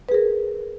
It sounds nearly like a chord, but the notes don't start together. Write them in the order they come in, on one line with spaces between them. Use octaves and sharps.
B4 G#4 A#4